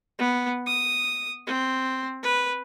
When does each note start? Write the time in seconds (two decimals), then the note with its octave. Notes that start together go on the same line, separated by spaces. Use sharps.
0.19 B3
0.66 D#6
1.47 C4
2.23 B4